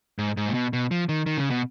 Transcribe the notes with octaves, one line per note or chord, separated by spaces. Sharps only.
G#2
G#2
A#2
B2
B2
F3
D#3
D#3
C#3
B2